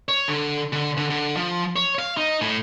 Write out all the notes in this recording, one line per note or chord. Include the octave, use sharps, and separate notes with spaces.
C#5
D3
D3
D3
D3
F3
C#5
F5
D#4
A2